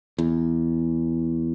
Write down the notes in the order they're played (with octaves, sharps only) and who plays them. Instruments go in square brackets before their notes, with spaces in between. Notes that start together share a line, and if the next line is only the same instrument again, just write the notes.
[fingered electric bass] E2